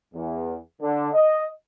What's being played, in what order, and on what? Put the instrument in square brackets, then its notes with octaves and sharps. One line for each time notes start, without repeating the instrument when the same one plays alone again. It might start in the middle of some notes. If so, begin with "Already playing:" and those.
[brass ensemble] E2
D3
D#5